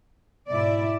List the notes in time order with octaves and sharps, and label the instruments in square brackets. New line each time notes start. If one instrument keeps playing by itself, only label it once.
[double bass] G#2 B2 [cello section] E4 D5